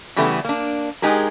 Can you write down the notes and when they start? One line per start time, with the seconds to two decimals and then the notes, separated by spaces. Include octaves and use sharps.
0.16 C#3 E3 G3 A3 B3
0.45 A#3 D4
1.02 G#3 D#4 G4 G#4 A#4